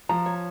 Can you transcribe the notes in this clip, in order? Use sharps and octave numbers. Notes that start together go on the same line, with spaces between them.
F3 A#5
C#5